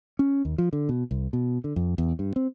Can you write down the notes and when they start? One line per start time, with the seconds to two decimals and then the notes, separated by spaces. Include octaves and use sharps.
0.19 C#4
0.45 D#2
0.58 F3
0.73 D3
0.89 B2
1.11 C2
1.33 B2
1.64 D3
1.76 F2
1.98 E2
2.19 G2
2.36 C4